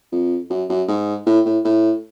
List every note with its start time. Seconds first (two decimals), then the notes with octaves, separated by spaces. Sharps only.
0.12 F2
0.50 F#2
0.69 F#2
0.88 G#2
1.26 A2
1.45 A2
1.65 A2